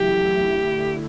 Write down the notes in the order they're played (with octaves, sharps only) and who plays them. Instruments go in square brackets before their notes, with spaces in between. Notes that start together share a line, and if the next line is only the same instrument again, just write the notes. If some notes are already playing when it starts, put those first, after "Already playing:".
Already playing: [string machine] E2 C#3 F#3 A3 E4 [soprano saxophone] G4
[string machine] D3 A3 E4